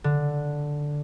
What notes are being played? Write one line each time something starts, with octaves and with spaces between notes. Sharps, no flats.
D3